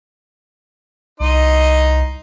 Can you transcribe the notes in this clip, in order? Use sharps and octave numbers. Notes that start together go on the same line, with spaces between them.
C2 D#4 D#5 C6